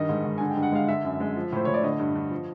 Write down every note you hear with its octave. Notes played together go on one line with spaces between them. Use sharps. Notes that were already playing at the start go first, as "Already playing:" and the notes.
Already playing: G2 D#3 D#5
G#2
G#2
D3 G#5
G5
G2
F#5
G#3 F5
D3 E5
F#2
G#3
F3
A2 C5
A2 C#5
D5
D3 D#5
G2
G2
F3